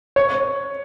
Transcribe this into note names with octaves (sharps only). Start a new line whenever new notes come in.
C#5